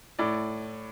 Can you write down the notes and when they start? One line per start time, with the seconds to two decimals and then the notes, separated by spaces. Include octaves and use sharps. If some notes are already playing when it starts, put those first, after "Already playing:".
0.19 A2 D5